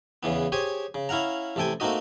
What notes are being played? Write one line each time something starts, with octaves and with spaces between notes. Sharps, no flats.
E2 C#3 E3 B3
G4 G#4 C5 C#5 G#5
C#3
C#4 E4 F5 F#5 A#5
A1 C3 A4 G5 G#5
A3 A#3 C4 D#4 F#4 D#5